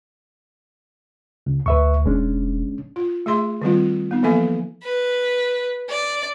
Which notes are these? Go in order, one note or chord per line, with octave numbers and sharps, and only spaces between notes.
C#2
D2 B4 E5 C#6
E1 G#3 C#4 D4
F4
A3 G#4 E5 C6
D#3 G3 C4 F4
B3 D#4
E3 F3 A#3 A4 E5 G#5
B4
D5